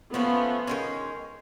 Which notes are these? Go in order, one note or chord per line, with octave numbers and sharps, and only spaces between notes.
F3 A3 B3 C#4 F4
D#3 G#3 C#4